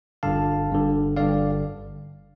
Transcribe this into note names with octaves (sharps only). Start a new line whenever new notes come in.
G1 G2 D3 F5 A5
G1 G2 D3
G1 G2 D3 D5 F5